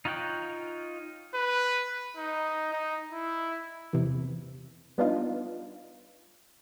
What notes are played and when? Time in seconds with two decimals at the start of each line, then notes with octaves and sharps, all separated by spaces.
0.05 D#4 F4 C#5 F#5 G5
1.34 B4
2.17 D#4
2.73 D#4
3.13 E4
3.93 E2 C3 E3
4.98 G3 B3 D4 D#4 F4